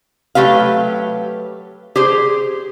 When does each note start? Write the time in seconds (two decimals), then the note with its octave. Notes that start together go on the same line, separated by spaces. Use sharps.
0.35 F#3 A3 G4 B4 F5
1.96 G4 G#4 C5